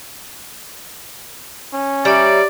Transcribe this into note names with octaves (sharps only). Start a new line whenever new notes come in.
C#4
G3 C#5 D5 E5 A#5